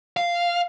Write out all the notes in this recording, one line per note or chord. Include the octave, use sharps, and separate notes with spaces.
F5